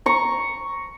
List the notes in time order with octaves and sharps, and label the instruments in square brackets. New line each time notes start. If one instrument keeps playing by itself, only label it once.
[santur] A#5 C#6